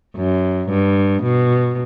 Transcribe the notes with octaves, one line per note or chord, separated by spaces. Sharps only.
F#2
G2
B2